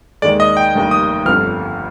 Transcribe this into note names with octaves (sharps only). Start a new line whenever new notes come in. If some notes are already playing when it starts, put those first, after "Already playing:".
D#2 D#3 G#3 D5
D#5
G5
F1 D#2 D#3 G3
D#6
G1 F2 D3 G3 C4 F6